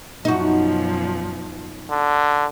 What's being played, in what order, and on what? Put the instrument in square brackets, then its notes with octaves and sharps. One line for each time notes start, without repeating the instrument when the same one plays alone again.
[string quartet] F#2 B2 F3 [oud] D#4 F#4
[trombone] D3